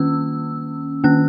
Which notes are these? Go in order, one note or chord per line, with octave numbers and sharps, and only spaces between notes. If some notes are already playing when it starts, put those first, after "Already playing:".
Already playing: D#3 A#3 C#4 E6
D#3 A#3 C#4 F#6